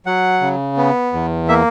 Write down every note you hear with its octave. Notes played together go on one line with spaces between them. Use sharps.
F#3 F#5
C#3
B3
E2
A#3 E5